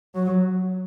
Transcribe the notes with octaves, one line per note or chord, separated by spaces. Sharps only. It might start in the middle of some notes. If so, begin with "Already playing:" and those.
F#3